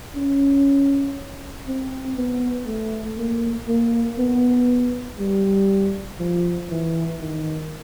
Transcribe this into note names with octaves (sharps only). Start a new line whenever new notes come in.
C#4
C4
B3
A3
A#3
A#3
B3
G3
F3
E3
D#3